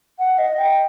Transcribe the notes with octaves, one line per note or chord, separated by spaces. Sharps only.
F#5
D#5
G5